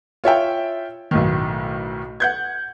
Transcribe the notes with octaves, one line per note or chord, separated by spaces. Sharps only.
F4 C#5 E5 G5
B1 A2 D#3
F#5 G6 G#6